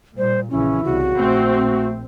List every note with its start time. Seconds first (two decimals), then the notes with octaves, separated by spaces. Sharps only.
0.18 A#2 G3 C5
0.50 A#1 C#3 E3 C#4 E4
0.84 C2 C#3 F#4
1.18 A#1 A3 C4